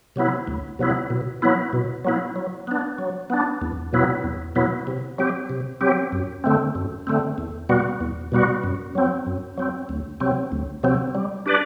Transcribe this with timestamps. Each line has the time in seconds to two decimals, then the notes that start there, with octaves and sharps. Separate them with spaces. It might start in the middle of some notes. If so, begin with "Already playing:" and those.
0.16 C3 F#3 B3 E4
0.47 D2
0.79 C3 F#3 B3 E4
1.10 B2
1.42 F#3 B3 E4
1.73 B2
2.05 F#3 B3 E4
2.36 F#3
2.67 B3 D4
2.98 F#3
3.30 B3 D4
3.62 E2
3.93 B2 F#3 B3 E4
4.24 E2
4.55 B2 F#3 B3 E4
4.87 C3
5.18 F#3 C4 G4
5.50 C3
5.81 F#3 C4 G4
6.12 F#2
6.44 D3 A3 C4
6.75 F#2
7.07 D3 A3 C4
7.38 E2
7.69 B2 G3 B3 F#4
8.00 E2
8.32 B2 G3 B3 F#4
8.64 F#2
8.95 F#3 C4
9.26 F#2
9.58 F#3 C4
9.89 D2
10.20 C3 F#3 C4
10.52 D2
10.83 C3 F#3 C4
11.15 G3
11.46 D4 G4 B4 D5